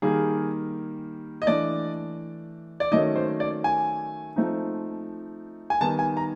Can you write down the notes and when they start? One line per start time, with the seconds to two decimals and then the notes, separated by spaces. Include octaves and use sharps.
0.02 D#3 G3 A#3 G#4
1.42 D#5
1.47 E3 A3 D4 D5
2.80 D5
2.92 D#3 F#3 A3 C#4 D#5
3.16 C5
3.40 D5
3.64 G#5
4.36 F3 A3 C4 D#4
5.70 G#5
5.81 D#3 G3 B3 D#4 A5
5.99 G#5
6.17 A#5